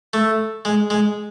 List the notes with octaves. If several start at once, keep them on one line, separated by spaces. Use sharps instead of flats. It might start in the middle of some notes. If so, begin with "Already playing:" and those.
A3
G#3
G#3